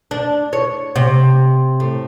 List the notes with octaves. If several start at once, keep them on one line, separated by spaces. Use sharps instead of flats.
D4
C#5
C3
A2